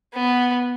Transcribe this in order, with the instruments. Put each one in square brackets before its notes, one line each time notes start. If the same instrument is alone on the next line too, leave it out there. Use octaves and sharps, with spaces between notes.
[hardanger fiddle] B3